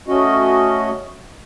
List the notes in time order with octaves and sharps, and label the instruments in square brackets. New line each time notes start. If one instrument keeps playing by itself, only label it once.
[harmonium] A3 C#4 F#4 D#5